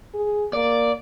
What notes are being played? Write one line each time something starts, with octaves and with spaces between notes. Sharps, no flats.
G#4
A#3 D5